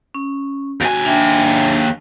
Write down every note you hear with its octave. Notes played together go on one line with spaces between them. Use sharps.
C#4
D#2 F#4 G#5
D4 E5 G5